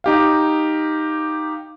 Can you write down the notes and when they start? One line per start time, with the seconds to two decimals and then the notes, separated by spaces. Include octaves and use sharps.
0.04 D#4 G4 F5